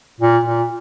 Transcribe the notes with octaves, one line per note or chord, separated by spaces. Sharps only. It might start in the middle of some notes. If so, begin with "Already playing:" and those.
A#2
A#2